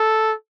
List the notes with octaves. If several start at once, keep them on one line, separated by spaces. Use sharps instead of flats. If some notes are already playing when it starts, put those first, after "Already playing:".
Already playing: A4